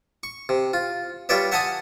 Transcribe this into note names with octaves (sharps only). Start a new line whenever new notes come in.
C#6
C3
F4
G3 F4 B4 C#5 D5 E5
E5 F#5 G#5 A5 C6 D#6